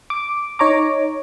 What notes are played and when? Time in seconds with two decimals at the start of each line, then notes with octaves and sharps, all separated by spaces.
0.10 D6
0.59 D#4 C#5 A#5 D6